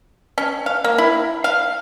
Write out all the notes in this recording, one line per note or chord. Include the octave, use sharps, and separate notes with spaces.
C#4
F5
A#3
E4
F5